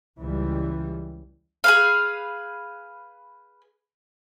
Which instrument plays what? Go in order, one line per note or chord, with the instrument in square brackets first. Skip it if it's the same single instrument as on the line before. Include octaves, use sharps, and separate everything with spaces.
[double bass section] C#2 E3 G3
[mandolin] G#4 B4 F5